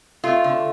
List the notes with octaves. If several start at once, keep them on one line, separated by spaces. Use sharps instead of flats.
A3 F4
D3